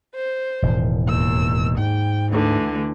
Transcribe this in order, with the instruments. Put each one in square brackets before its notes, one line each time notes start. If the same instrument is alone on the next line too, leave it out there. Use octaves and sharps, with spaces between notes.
[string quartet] C5
[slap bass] E1 A2 D#3
[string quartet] D#2 E6
[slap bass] G#2 [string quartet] G5
[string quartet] D2 D3 E3